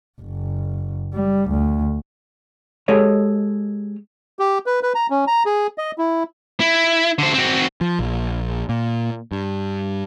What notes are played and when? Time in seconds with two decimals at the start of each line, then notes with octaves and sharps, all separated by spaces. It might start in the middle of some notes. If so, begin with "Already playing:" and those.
0.21 F#1
1.13 G3
1.50 D2
2.88 G#3 G4 A4 C#5 D#5
4.39 G4
4.66 B4
4.83 B4
4.95 A#5
5.10 C#4
5.27 A#5
5.46 G#4
5.78 D#5
5.98 E4
6.60 E4
7.19 D3 C5
7.34 C4 F#4
7.81 F3
7.99 A#1
8.69 A#2
9.32 G2